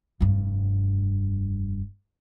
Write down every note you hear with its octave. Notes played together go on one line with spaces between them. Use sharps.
F1 G2